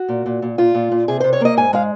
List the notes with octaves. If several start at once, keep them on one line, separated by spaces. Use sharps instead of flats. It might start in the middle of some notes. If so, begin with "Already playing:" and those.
Already playing: F#4
A#2
A#2
A#2
A#2 F4
A#2
A#2
C3 G#4
C3 C5
C#5
A#3 D#5
G#2 G#5
G#3 F5